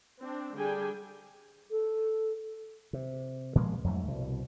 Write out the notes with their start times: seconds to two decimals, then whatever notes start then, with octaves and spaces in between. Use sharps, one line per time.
0.20 C4 D4
0.55 D3 G3 D4 G#4 G5 G#5
1.71 A4
2.93 C3
3.55 A#2 F3 G#3 A#3
3.84 F2 G#2 F#3 A3
4.08 C2 B2